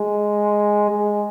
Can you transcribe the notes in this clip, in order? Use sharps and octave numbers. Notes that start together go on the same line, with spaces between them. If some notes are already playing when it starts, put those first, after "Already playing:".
Already playing: G#3
G#3